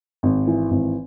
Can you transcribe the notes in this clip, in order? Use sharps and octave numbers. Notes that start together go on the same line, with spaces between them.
G#1
E3
G#1